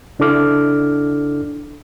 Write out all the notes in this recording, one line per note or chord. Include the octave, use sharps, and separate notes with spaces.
C#3 D4 E4 A4 D6 F6